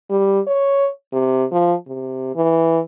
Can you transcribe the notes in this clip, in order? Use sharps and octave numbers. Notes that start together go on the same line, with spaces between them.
G3
C#5
C3
F3
C3
E3